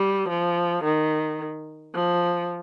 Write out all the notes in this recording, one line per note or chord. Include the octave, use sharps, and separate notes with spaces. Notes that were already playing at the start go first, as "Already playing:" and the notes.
Already playing: G3
F3
D#3
F3